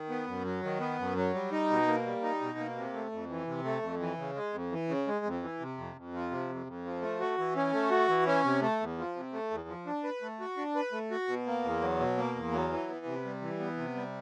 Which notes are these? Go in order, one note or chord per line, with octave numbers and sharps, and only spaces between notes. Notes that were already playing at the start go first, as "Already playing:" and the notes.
Already playing: D#3
B3
F#2
F#3
D#3
B3
F#2
F#3
G3
D#4
B2
A#3
G3
D#4
B2
A#3
C3
A3
F2
E3
C3
A3
F2
E3
C#3
G#3
F2
E3
C#3
G#3
F2
E3
C3
F2
F2
F3
C3
F2
F2
F3
A3
F#4
E3
C#4
A3
F#4
E3
C#4
C3
A3
E2
F3
C3
A3
E2
F3
D4
B4
A3
F#4
D4
B4
A3
F#4
B2
A#3
E2
F#3
B2
A#3
E2
F#3
E3
B3
C3
G3
E3
B3
C3
G3